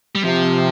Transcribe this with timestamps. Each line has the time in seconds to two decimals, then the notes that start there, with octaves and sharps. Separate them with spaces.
0.15 G3
0.24 C3 F3